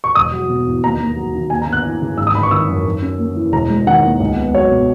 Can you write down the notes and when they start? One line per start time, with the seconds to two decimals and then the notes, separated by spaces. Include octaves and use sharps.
0.04 C#6
0.15 E1 D#6
0.33 F#3
0.49 B2
0.67 E2
0.83 D#2 A#5
1.00 D#2
1.17 F#3
1.34 D#3
1.50 D#2 G#5
1.62 A#5
1.67 B3
1.73 F#6
1.85 E3
2.01 C#3
2.18 G#1 E6
2.27 D#6
2.34 G#1 B5
2.43 C#6
2.51 D#3 E6
2.69 F#2
2.86 F#2
3.02 C#4
3.19 A#3
3.36 E3
3.52 E1 A#5
3.70 G#3
3.87 D#3 F#5
4.04 D#2
4.20 C#2
4.37 B3
4.54 F#3 C#5
4.71 B2